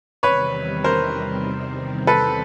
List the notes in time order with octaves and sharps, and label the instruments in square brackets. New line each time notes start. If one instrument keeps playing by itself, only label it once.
[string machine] E2 C3 D#3 G3 C4 [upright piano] B4 C#5
[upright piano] A#4 C5
A4 B4